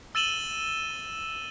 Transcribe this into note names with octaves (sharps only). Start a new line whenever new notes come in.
E6 A6 D#7 E7 F#7 G7